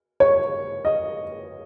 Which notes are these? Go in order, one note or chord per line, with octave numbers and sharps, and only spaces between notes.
C#5
D#5